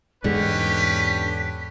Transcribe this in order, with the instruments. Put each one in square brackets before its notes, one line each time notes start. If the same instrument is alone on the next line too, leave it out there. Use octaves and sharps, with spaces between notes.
[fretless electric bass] E2 G#2 G#3 [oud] D3 [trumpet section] C#4 G4 B4 [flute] B6